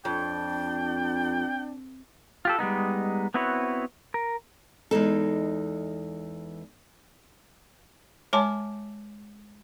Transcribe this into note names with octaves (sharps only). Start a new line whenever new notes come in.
F2 D4 G5
F4 G4 A4
G3 G#3 B3 D#4
B3 C4 E4 F#4 B4 C#5
A#4
E2 G#3 D#4 A4
G#3 C#5 G#5 A5 C6 D6